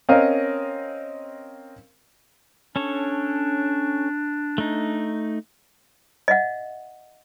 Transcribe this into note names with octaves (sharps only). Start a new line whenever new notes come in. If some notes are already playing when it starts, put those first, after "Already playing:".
C4 C#4 A#4 D#5 F5
C#4 D4 A4 C#5
A3 D#4
D#5 E5 F#5